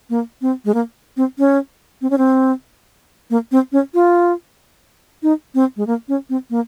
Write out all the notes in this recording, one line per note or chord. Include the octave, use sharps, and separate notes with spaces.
A#3
C4
G#3
A#3
C4
C#4
C4
C#4
C4
A#3
C4
C#4
F4
D#4
C4
G#3
A#3
C#4
C4
A#3